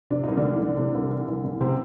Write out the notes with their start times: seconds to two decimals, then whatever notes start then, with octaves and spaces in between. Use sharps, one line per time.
0.10 C3 D4
0.24 C2 D#4
0.37 D3 D4
0.44 E3
0.60 C2
0.77 C3
0.94 C2
1.10 E3
1.28 C2
1.44 C#3
1.61 C3 C4